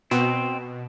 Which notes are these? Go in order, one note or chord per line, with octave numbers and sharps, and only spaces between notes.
B2 C4